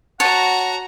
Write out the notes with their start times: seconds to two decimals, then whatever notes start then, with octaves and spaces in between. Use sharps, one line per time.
0.20 F#4 C#5 F#5 A5 A#5